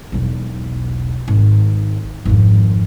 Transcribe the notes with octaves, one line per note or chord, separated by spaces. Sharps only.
E1 B1
G#1
G#1 F2